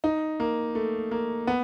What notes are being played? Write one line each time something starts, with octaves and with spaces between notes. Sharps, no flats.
D#4
A#3
A3
A#3
B3